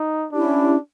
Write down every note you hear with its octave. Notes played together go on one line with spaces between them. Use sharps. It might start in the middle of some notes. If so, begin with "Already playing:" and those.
Already playing: D#4
C#4 D4 E4 G4